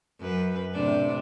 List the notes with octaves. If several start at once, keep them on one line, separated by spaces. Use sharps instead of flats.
F#2 B4
A2 C3 D4